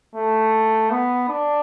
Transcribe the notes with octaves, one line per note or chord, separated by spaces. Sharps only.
A3
B3
D4